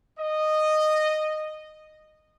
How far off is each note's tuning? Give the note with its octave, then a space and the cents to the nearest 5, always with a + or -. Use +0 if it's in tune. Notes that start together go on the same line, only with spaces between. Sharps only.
D#5 -10